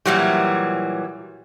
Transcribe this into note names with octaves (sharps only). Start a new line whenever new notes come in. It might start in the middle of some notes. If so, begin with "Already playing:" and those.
A#2 E3 F#3 G3